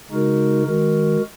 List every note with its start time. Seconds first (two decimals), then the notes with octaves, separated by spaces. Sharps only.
0.10 C#3 G#3 D#4 F#4 A#4
0.65 D#3 G#3 F#4 A#4